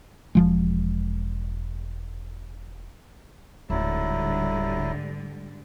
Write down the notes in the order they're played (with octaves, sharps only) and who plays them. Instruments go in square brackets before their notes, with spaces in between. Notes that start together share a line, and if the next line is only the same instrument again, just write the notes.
[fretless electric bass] E1 F3 G#3
[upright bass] D1 [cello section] G#2 D3 G3 [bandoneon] F#3 E4